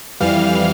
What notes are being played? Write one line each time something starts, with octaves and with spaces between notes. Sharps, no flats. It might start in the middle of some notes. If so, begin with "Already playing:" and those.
F2 E3 G3 F5 F6